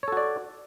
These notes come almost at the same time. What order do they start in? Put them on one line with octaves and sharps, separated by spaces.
C#5 A4 F#4 D5